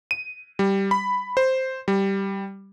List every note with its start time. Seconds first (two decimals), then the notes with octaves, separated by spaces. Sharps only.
0.11 D#7
0.59 G3
0.91 B5
1.37 C5
1.88 G3